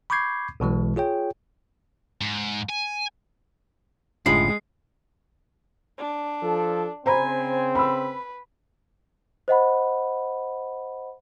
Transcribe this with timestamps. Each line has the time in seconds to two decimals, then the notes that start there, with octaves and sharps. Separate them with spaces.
0.10 B5 C#6 D6 G6 G#6 C7
0.60 B1 B2 E3 G#3
0.96 F4 G#4 C#5 G5
2.21 G#2
2.69 G#5
4.26 F#1 A2 D3 G#3 C#4 F4 B5 C7
5.98 D4
6.43 F3 A4
7.06 C#3 C4 C5 G#5 A#5 B5
7.75 B4 B5 E6
9.48 C5 D#5 F#5 B5